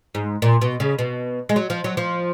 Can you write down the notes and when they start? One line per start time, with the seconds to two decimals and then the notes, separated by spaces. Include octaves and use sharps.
0.15 G#2
0.42 A#2
0.61 B2
0.80 C#3
0.99 B2
1.49 G#3
1.56 F#3
1.70 F3
1.84 F#3
1.97 F3